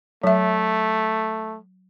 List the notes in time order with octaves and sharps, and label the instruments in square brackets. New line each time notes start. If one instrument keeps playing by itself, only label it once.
[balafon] F#3 E5 [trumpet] A3